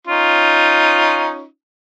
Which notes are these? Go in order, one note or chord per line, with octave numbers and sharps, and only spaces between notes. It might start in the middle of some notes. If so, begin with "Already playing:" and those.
C#4 D#4 F4